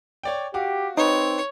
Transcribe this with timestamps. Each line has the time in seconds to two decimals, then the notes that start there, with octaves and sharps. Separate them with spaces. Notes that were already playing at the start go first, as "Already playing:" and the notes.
0.23 C#5 D5 G5
0.54 F#4 G4 F5 D6
0.97 C4 D#4 B4 C#5